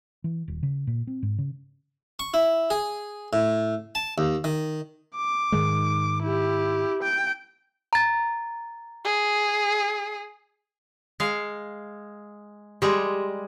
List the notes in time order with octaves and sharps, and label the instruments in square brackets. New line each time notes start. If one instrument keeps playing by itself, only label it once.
[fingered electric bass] E3
D#1
C#3
A#2
C4
G#2
C#3
[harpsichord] C#6
E4
G#4
A2
A5
D#2
D#3
[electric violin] D6
[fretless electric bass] G#2 D#3 G#3
[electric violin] E4 G4
G5
[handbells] A#5 A6
[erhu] G#4
[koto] G#3 F5
[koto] G3 G#3 [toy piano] G4 C6 D6